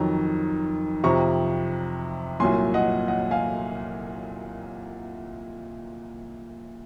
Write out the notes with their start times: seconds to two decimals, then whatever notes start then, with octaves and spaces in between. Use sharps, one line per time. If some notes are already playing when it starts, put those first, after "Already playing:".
Already playing: F2 D#3 F#3 A#5
1.04 F2 C3 F3 A#5 C#6
2.40 C2 A#2 F#3 G#5 C6
2.74 D#5 F#5
3.08 D#5 F#5
3.31 F5 G#5